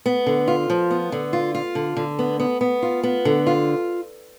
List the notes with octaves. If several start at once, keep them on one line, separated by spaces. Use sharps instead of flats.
B3
D3
F4
F3
B3
D3
F4
F4
D3
D3
B3
B3
B3
F4
B3
D3
F4